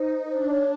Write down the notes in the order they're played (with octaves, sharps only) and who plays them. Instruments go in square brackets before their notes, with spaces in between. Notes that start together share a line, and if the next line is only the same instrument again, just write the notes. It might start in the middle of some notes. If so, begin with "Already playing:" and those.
Already playing: [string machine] D#4 [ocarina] C5
[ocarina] B4
[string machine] D4 [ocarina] C5
[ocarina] C#5